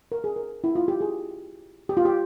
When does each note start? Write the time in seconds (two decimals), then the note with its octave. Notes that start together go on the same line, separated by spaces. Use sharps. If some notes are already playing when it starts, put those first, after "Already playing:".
0.12 A#4
0.24 G#4
0.36 A#4
0.64 E4
0.75 F4
0.88 G4
1.01 G#4
1.89 G4
1.97 F4
2.05 G4